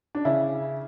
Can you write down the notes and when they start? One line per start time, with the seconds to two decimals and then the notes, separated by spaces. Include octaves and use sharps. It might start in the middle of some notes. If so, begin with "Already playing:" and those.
0.15 D4
0.25 C#3 E4